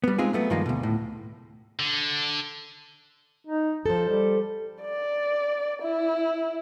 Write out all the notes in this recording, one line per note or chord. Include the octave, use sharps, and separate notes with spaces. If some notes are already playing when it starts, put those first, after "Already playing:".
G3 B3
G#3 C4 D#4 F4 G#4
F#3 A3 B3
G2 D#3 F3 G#3 A#3 D#4
D2 B2
A2
D3
D#4
F3 A4 C5
G3
D5
E4